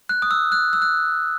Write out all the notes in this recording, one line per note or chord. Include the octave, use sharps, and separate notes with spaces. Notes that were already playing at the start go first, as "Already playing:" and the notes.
F#6
D#6
E6
F#6
E6
F#6